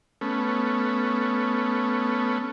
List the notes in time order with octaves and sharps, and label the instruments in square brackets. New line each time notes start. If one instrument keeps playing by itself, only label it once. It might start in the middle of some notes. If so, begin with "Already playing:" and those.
[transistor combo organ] A3 B3 C#4